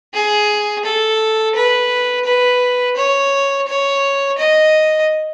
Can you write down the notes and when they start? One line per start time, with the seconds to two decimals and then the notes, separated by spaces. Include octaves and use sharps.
0.14 G#4
0.85 A4
1.55 B4
2.25 B4
2.97 C#5
3.67 C#5
4.38 D#5